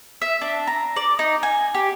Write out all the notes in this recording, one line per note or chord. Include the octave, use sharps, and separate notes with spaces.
E5
D4
A#5
D5
D#4
G#5
G4